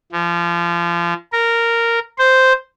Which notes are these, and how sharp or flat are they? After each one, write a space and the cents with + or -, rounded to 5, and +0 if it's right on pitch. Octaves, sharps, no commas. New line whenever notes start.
F3 -30
A#4 -10
C5 -5